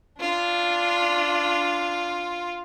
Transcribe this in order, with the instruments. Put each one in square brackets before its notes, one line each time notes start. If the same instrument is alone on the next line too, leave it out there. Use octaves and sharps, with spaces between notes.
[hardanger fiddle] D4 [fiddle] F4